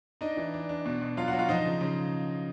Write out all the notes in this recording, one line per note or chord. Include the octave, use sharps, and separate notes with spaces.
D4 D#4 D#5
E3
D4
D4
B2
B2
F#3 F4 F5
F#4 F#5
F#3
F4 F5
F3 D#4 D#5
C#3
C#3